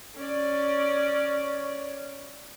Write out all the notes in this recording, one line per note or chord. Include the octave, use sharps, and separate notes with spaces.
C#4 D5